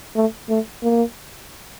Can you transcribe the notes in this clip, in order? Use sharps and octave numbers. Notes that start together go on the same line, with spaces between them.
A3
A3
A#3